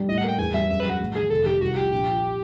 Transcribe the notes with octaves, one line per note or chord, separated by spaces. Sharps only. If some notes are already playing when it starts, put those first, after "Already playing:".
Already playing: G3
A2 D#5
F#5
A#3 G5
E2 G#5
G3 E5
F#2 E5
B4
F#3 F#4
A1
D#3 G#4
F1 A4
D#3 G4
C2 F#4
F3 G4
A#1 G4
F3